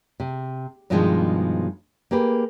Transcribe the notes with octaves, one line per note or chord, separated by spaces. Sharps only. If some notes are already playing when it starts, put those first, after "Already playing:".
C3
G2 B2 D#3 F3 G3 G#3
A#3 G4 G#4 B4